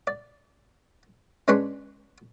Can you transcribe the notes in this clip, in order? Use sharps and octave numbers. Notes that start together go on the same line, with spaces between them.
D5
G#3 C#4 D4 B4 C6 C#6